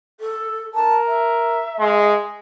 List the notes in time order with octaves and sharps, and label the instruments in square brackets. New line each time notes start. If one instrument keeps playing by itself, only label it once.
[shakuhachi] A4
[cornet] A#4 [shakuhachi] A5
[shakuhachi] E5
[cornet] G#3